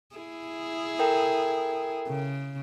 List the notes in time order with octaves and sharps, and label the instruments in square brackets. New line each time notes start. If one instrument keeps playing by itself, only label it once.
[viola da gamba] E4 G#4
[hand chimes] A4 A#4 G5
[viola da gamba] C#3